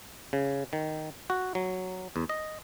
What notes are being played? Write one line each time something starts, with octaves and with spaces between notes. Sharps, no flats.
C#3
D#3
F#4
F#3
E2
D#5